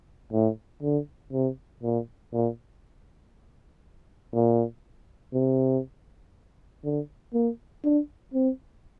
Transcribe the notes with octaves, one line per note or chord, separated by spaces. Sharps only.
A2
D3
C3
A#2
A#2
A#2
C3
D3
A#3
D4
C4